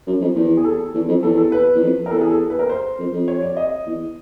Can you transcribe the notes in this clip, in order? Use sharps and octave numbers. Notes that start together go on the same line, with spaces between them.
F#2
F2
E2
G#4
A4
A4
E2
F2
E2 A4
A4
B4
E2
F2
A#4
E2 A4
G#4
A4
B4
A#4
C5
F2
F2
C#5
D5
D#5
E2